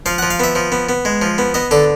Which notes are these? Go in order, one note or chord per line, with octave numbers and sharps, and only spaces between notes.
F3 F5
F#5
F3
F5
B3 E5
F3
B3
B3
G#3
F3
B3
B3 D#5
D3 A4